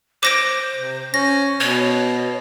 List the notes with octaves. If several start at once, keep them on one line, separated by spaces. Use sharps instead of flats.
C5 D6 A#6 D7
C3
C#4 A#6
B2 C#5